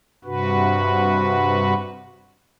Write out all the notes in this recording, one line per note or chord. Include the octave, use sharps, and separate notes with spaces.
G2 C3 F#4 B4